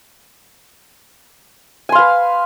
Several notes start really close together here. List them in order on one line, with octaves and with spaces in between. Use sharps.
G#5 C6 F5 B4